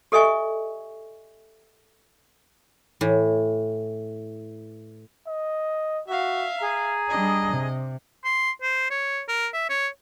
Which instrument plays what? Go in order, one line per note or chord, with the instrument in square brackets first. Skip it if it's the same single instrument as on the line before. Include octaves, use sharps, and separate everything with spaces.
[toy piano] G4 A4 D#5 E5 G#5 C#6
[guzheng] A2 E3
[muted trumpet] D#5
[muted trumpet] F#4 [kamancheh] E5 F5
[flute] G#4 [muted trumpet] A#5
[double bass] G3 D4 [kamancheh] D#5
[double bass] C3
[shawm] C6
C5
C#5
A#4
E5
C#5